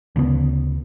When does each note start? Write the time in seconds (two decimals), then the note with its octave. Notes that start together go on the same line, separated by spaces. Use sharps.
0.16 D2 C#3 G#3 B3